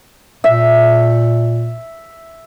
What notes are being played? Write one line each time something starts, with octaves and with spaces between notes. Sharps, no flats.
A#2 E5